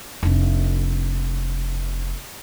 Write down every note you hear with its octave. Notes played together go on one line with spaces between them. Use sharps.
F1 D4